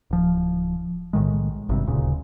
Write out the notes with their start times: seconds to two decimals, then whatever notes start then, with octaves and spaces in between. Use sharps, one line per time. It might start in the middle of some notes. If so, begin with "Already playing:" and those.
0.11 D1 F3
1.13 B1 A2 D#3 G#3
1.69 G#1 G2 C3
1.87 D#1 D2 A#2 C#3